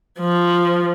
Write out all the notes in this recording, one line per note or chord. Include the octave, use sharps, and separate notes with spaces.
F3